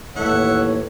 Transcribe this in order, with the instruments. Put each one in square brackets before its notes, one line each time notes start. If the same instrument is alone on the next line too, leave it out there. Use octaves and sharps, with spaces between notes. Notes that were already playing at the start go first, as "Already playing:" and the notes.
[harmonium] D#2 A2 C#5 [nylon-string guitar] E3 A3 [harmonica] E5 F#5